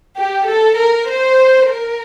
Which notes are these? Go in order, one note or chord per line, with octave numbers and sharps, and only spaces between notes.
G4
A4
A#4
C5
A#4